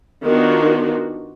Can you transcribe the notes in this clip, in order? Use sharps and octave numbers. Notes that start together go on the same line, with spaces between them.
D#3 B3 D4 F4 F#4